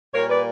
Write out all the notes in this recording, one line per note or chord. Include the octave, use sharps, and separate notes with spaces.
A#2 G3 A#3 A#4 C#5
B4 D5